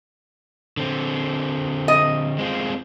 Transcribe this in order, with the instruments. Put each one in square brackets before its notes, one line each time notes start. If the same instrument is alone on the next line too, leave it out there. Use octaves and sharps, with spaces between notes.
[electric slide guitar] D3 C4
[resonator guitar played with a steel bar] D#5
[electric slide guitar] G#3 C4 F4